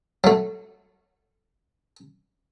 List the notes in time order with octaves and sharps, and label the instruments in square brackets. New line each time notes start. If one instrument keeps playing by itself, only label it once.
[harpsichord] F#3 A3